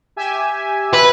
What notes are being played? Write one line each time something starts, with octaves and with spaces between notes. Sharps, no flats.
G4 E5 G#5
B4